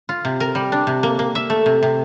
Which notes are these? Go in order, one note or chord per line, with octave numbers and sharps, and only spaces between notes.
F4
C3
A#4
G3
D4
C3
A#3
A#3
E5
A3
C3
C3